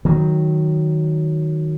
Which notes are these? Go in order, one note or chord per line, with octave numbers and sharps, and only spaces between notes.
D#3 F#3